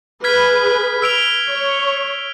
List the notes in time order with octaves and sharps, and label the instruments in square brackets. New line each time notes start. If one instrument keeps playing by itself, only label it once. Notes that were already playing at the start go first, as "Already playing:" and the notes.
[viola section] G#4 B4 [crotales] F6 G#6 B6
[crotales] E6 D7 F7
[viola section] C#5